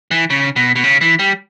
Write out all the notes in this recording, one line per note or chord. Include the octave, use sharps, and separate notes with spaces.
E3
C#3
B2
B2
C#3
E3
G3